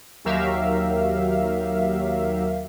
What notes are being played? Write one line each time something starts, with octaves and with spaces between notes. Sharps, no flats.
D#2 F#3 G4 A#4 E5 F5